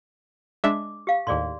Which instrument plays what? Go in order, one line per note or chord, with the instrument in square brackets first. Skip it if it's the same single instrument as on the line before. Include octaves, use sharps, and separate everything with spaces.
[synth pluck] G#3 D4 E5 [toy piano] D6
[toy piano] G4 F5
[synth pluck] D#2 A2 [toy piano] G#4 D5 C6